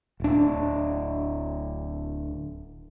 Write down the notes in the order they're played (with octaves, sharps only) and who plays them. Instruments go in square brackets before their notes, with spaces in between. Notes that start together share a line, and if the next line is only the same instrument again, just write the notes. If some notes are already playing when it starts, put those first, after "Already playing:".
[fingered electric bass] D1 D4